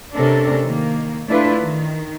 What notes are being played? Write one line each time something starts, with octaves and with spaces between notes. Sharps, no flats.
C3 A3 C#4 D4 A4 A#4
D#3 A#3
A3 D4 E4 F4 B4
D#3